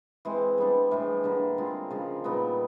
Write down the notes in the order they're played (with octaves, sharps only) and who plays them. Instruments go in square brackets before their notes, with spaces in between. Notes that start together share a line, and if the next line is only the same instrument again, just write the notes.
[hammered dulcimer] E3 G#3 C4
G3 B3 D4
A2 E3 G#3
D3 G3 A#3
G#3 C4 F4
C#3 F3 G#3
A#2 G3 B3 D#4